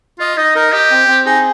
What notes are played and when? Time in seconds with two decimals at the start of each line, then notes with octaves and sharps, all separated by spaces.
0.19 F4 D#5
0.37 D#4 D#5
0.56 D#4 A#4
0.72 G4 D#5
0.91 C4
1.08 C4
1.26 D#4 G#4